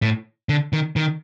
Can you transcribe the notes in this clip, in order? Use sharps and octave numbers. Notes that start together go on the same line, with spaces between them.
A2
D3
D#3
D#3